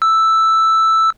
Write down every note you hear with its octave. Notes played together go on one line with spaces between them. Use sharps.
E6